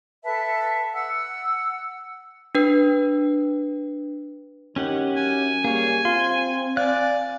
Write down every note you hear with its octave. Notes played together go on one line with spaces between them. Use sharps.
A4 B4 E5 A5
F#5 E6
D4 B4
D#3 C#4 G4 F#5
F#2 G#5
G3 A#3 G#4 C#5
C4 F4 C6
D5 F5 G#5 F#6